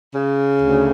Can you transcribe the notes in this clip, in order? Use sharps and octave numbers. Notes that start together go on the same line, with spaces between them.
C#3
D2